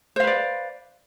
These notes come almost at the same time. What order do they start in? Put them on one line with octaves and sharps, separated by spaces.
C5 F5 B4 D5